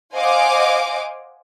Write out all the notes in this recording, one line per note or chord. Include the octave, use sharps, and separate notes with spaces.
C5 D#5 F5 F#5 G#5 D6